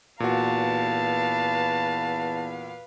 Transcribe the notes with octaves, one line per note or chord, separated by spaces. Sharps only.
E2 A#2 F#4 B4 F5 A5